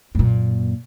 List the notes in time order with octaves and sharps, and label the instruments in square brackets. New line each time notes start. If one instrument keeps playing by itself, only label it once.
[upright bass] F#2 A#2